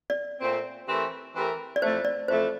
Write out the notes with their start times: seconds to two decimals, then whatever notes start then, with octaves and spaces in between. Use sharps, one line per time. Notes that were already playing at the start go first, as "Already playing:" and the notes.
0.10 D5
0.40 A#2 A3 C4
0.87 E3 A3 C4 G4 A#4
1.35 E3 A3 C4 G4 A#4
1.76 D5
1.82 F2 E3 A3 C5
2.05 D5
2.28 F2 E3 A3 C5